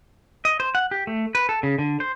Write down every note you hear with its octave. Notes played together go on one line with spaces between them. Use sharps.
D#5
C5
F#5
G4
A3
B4
A4
C#3
D3
C5